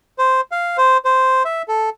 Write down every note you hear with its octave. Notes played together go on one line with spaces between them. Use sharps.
C5
F5
C5
C5
E5
A4